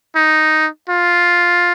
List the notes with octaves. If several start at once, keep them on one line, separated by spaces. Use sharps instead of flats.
D#4
F4